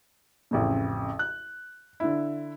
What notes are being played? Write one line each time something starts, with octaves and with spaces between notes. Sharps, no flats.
A1 F2 C#3
F#6
D3 E4